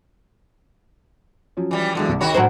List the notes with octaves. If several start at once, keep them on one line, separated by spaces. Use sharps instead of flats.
F3 F#3 C#4
E3 G3
E2 G#2 D3 F#3 G#3
C2
D#3 F#4 C#5 B5
A2 F#3 D4 C5